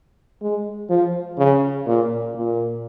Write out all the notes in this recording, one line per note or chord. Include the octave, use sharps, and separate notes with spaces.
G#3
F3
C#3
A#2
A#2